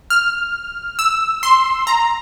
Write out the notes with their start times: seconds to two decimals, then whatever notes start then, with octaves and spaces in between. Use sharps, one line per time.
0.10 F6
0.99 E6
1.43 C6
1.87 A#5